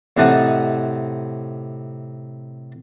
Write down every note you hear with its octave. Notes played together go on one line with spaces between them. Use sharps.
A2 C3 D#4 F#5 A5 D#6